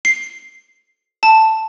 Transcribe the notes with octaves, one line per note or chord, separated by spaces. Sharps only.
C7
A5